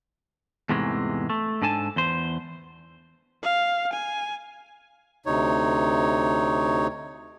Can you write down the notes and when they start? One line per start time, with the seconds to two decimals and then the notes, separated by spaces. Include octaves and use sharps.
0.69 E2 G#2 C3 E3 G#3 A3
1.30 A3
1.62 G#2 D4 A4 G#5 A5
1.96 E2 C5
3.43 F5
3.93 G#5
5.26 D2 C3 D#4 C#5